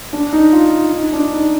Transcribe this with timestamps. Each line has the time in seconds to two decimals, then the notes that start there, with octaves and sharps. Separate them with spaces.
0.13 D4
0.33 D#4
0.53 F4
0.93 D#4
1.12 D4
1.33 D#4